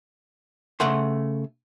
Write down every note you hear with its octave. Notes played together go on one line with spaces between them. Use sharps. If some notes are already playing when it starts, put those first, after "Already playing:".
C#3 A3 F#5 C6